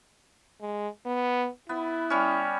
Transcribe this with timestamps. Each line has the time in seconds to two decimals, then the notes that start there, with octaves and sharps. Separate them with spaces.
0.61 G#3
1.06 B3
1.69 B3 E4
2.10 G3 C#4